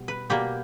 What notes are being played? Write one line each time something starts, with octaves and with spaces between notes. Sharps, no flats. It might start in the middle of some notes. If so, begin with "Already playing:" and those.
Already playing: B2 G3
B4
B2 G3 A#3 G4